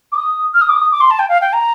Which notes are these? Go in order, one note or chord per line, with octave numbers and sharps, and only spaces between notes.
D6
D#6
F6
D#6
D6
D#6
D6
C6
A5
G5
F5
G5
A#5